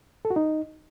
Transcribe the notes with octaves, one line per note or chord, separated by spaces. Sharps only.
A4
F#4
D#4